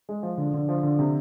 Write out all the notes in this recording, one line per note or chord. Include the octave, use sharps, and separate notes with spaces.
G#3
F3
D3
D3
F3
D3
C3